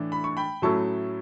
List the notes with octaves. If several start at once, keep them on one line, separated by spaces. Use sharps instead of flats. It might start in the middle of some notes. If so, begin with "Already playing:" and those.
Already playing: A2 E3 A3 D4
B5
C#6
G5 B5
A2 F#3 A3 C#4 E4 A5 C#6